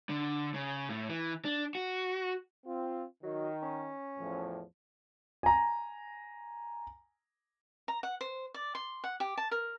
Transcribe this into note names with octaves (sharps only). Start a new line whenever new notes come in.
D3
C#3
A2
E3
D4
F#4
C4 F4
D#3 F#3 D#4
C#4
E2 A2 F3
G#5 A#5
A#5
F#5
C5
D5
C6
F#5
G4
A5
A#4